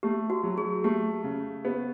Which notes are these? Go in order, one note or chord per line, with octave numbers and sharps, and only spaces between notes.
A3 G4
F#4
F#3
G#4
A3 G4
C#3
B3